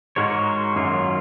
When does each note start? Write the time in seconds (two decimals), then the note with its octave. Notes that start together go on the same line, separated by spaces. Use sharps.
0.16 G#2 G#3 D#4 F#4 A#4 C#5
0.76 F#2 D#3 F#3 A#3 F4